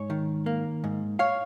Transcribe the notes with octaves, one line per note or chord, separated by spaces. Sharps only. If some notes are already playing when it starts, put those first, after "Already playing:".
Already playing: G#2 C#5
D#3
A#3
G#2
C#5 F5